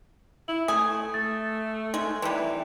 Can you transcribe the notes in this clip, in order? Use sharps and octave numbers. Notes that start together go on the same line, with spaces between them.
E4 F#7
A3 G#5 D#6
A3 A6
G#3 D#4
C3 E3 G3